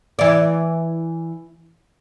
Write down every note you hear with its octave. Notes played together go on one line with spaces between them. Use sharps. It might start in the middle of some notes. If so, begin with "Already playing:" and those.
E3 D5